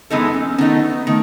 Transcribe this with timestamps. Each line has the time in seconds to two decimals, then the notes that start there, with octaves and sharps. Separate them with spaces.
0.10 F#2 E3 G#3 B3 C#4 D#4 A4
0.34 C#4
0.58 D#3 A3 B3 D#4
1.07 D#3 A3